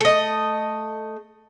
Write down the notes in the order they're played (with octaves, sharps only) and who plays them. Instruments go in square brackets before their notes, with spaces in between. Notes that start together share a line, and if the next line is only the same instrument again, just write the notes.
[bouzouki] A3 D#5